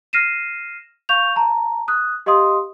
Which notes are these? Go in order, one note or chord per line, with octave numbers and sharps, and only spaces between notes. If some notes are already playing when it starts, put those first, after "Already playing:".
F6 A#6 C7 D#7 E7
F5 C#6 G6 F7
A5 A#5
D#6 F#6
G4 D#5 F5 C6 D#6